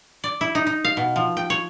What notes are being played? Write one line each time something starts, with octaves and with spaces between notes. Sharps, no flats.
D5
E4
D#4
D#4
F5
B2
F3
G5
C#5